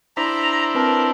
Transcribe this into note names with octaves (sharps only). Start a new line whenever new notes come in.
D4 E4 C5 A#5 B6
C4 A#4 B4 A5